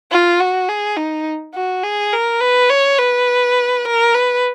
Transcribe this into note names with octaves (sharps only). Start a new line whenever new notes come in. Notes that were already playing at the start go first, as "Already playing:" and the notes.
F4
F#4
G#4
D#4
F#4
G#4
A#4
B4
C#5
B4
A#4
B4